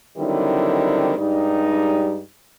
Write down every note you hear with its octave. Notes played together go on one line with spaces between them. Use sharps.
D3 D#3 F#3 G3 C4 E4
G2 G3 G#3 D#4